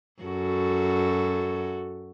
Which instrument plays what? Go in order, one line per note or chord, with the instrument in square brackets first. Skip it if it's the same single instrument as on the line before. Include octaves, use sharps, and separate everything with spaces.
[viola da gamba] F#2 F#4 A4